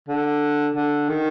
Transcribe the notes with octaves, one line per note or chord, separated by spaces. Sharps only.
D3
D3
D#3